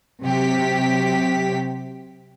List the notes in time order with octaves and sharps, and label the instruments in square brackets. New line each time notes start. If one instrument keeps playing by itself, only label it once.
[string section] C3 F#3 G4 B6